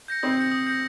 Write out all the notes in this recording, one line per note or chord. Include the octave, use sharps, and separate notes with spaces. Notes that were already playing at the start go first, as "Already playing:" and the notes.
G6 A#6 C#7
C4 D#6
G6 A#6 C#7
D#6
G6 A#6 C#7